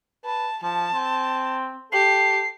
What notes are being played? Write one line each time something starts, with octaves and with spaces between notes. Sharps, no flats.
B4 A5
F3 A5
C4
G4 A4 C7